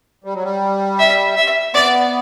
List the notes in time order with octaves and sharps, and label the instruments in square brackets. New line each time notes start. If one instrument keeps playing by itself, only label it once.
[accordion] G3
F#3
G3
[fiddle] E5
E5
[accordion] B3 [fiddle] D5